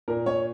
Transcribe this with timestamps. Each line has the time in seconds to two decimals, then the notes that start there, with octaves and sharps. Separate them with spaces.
0.08 A#2 A#4
0.26 C#5